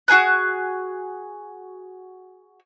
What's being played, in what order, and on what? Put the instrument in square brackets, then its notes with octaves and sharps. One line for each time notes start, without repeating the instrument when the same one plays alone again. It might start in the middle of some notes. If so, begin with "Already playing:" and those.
[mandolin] F#4 G#4 G#5 F#6